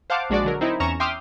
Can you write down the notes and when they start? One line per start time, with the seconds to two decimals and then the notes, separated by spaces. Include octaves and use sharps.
0.10 C5 F5 F#5 A5 D6
0.30 A#1 G#3 D4 F#4 D5
0.44 D3 F#3 A#4
0.61 C4 D#4 E4
0.80 E2 C#4 A#5 C#6 E7
1.00 E5 G5 C6 D6 D#6 F6